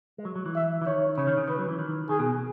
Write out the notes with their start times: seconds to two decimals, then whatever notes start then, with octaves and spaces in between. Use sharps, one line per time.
0.18 G#3
0.25 F#3
0.36 F#3
0.46 E3
0.56 E5
0.82 E3
0.87 D#3 C#5
1.17 C#3 C#5
1.27 D#3
1.38 C#3
1.48 D#3 B4
1.59 F#3
1.69 E3
1.79 D#3
2.09 D#3 G#4
2.19 B2